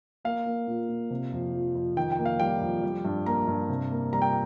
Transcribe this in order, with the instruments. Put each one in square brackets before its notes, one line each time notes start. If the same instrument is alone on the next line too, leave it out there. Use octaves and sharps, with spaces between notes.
[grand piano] A#3 F5
A#3
A#2
A#2
C3
F2
F3
F2
D#3 G5
G5
A#3
F5
G3 G5
F2
G3
G2
A#3 A#5
G2
C3
A#3
G3 A#5
G5